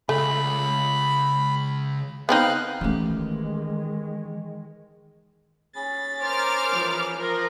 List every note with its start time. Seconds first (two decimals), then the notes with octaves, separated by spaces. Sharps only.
0.09 C#2 A3 B5
2.29 B3 C4 D#4 F5 F#6
2.81 D#3 E3 G#3 A3 C#4 G4
5.76 C#4 G#4 B5 A6
6.21 A#4 C5 D6 F6
6.73 E3 F3
7.18 F3 A#4